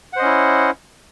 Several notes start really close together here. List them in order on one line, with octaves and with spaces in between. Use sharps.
F#5 C5 D#5 C#4 E4